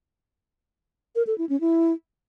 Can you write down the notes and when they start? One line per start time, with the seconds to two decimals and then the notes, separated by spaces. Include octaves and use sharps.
1.15 A#4
1.27 A4
1.38 E4
1.49 C#4
1.61 E4